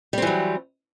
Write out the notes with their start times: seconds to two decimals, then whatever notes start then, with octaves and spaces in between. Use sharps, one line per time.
0.13 G3
0.18 C4
0.22 E3
0.27 F#3